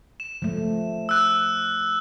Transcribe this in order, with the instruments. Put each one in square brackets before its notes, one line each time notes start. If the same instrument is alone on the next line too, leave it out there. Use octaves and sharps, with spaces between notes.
[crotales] E7
[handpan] F3 A3
[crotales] E6 F#6